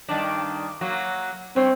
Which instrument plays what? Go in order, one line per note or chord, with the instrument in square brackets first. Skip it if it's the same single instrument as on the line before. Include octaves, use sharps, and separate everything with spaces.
[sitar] G2 D#3 D4
F#3 A#3 F#4
[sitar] G2 C#5 [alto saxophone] C4